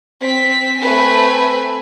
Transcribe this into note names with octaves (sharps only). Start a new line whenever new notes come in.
C4 B6
A3 C4 B4 G#5